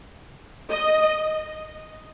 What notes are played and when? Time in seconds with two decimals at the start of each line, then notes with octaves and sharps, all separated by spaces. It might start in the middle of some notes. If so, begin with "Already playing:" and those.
0.70 D#5